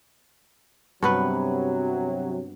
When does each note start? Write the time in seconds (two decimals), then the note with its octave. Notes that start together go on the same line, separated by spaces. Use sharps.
1.03 G2 C3 F#3 B3 B4